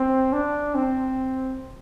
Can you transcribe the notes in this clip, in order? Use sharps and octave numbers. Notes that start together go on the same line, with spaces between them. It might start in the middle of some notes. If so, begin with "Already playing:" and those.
Already playing: C4
D4
C4